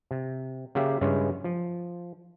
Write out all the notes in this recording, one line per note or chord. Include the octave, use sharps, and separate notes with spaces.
C3
C#3 A#3 G4 E5 F5
G2 C#3 G#3 C#4 E4
F3